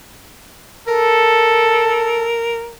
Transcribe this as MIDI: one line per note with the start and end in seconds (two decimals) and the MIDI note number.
0.88 2.36 69
0.88 2.76 70